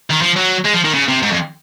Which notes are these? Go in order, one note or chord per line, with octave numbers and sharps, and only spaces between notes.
D#3
F3
F#3
G#3
F3
D#3
C#3
C3
G#2
F2